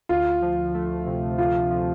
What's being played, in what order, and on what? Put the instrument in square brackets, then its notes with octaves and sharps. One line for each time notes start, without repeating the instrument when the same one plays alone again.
[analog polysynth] D2 [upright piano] F4
[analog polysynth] F3
A3
C3
[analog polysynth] D2 [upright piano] F4
[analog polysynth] F3